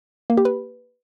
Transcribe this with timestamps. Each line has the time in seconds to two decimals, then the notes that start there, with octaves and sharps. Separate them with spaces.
0.30 A#3
0.37 G4
0.45 B4